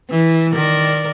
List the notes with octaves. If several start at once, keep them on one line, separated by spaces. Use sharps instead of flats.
E3
D#3 A#4 D5